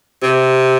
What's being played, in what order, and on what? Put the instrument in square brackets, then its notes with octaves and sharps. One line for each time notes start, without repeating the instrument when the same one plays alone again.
[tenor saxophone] C3